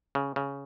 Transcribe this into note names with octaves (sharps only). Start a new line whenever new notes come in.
C#3
C#3